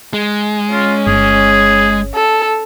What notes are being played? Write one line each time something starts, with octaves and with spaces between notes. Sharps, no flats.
G#3
C#4 F4
G1 G#4
A4